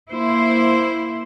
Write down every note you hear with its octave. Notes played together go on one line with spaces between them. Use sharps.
A#3 E4 C5